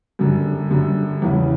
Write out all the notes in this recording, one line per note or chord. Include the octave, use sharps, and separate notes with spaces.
F#2 D3 G3
F#2 D3 G3
E2 C#3 G3 C#4 E4